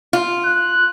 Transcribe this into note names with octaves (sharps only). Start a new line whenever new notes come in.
F4
F#6